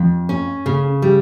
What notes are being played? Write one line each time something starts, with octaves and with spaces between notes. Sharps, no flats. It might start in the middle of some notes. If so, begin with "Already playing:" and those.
Already playing: F2
C#4
C#3
G3